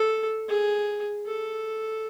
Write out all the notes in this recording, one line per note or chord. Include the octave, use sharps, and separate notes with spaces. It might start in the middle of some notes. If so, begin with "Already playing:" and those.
Already playing: A4
G#4
A4